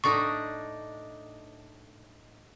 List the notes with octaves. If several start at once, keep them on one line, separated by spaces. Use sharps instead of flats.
A2 D4 D#4 C#6